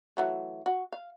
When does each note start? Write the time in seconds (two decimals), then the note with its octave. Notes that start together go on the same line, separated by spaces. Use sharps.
0.17 E3 F#3 A3
0.66 F#4
0.92 F5